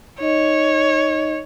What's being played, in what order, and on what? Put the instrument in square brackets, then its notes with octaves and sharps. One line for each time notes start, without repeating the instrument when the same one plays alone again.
[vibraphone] D#4 D#5 [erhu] C#5